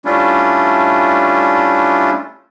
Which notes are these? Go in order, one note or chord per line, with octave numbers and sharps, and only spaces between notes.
G3 A3 C#4 D4 E4 F4